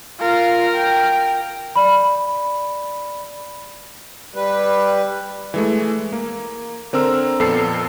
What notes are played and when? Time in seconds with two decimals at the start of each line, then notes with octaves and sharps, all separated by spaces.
0.21 F4 A#4
0.75 G5
1.76 D5 B5
4.36 G3 B4
5.54 E3 G#3 A3
6.13 A#3
6.93 D3 C4 A#4 E6
7.40 F2 A#2 B3 A4 C7